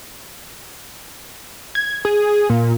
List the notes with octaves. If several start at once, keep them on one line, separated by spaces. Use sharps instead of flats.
G#6
G#4
A#2